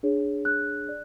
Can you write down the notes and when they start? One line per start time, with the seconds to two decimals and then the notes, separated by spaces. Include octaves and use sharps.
0.03 D4 G#4 C#5
0.45 F#6
0.89 D5